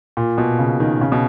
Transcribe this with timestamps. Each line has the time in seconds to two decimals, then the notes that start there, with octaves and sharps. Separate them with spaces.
0.17 A#2
0.38 B2
0.59 C#3
0.80 D#3
1.01 C#3
1.12 B2